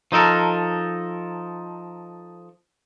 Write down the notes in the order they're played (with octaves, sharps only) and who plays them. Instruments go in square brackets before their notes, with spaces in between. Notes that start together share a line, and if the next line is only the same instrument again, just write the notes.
[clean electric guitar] F3 D#4 A4 A#4